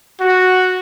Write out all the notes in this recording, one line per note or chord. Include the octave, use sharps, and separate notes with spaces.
F#4